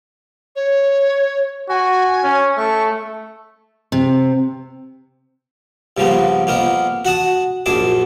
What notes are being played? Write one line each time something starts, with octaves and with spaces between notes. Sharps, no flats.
C#5
F#4 G#5
C#4
A3 C#6
C3
G2 C#3 F3 A#3 B3
F2 A#3 B3 A#4
F#4 F#5 A5 D#6
A#1 F#2 G#4 A5 D6